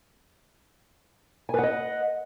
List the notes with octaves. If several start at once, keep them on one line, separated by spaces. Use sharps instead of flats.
B4 D#5 F#5 G#5